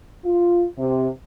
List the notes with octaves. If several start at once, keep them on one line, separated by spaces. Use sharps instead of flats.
F4
C3